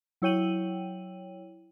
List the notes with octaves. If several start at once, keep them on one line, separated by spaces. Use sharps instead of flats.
F#3 E4 C#5 G5 D#7 F#7